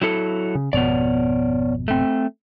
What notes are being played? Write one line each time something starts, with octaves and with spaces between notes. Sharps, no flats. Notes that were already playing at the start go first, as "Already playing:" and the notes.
F#3 E4 A4
C#3
G#1 F2 B2 B3 C#5 D5
A3 C4